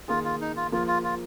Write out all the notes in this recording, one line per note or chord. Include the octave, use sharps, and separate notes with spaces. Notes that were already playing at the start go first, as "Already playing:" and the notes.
D#3 A#3 F4 G#4
F4
D#4
F4
F3 A#3 F4 G#4
F4
F4